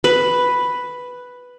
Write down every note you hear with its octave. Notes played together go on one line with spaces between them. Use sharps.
B4